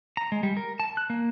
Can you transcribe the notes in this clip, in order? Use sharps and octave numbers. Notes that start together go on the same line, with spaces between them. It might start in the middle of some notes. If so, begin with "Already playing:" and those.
A#5
G#3
G3
A#4
A5
F#6
A#3